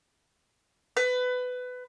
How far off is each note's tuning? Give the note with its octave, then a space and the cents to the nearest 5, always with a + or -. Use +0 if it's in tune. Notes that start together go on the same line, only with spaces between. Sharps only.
B4 +20